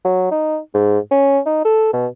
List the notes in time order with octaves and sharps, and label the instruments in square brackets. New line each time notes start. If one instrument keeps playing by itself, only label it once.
[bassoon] F#3
D#4
G#2
C#4
D#4
A4
B2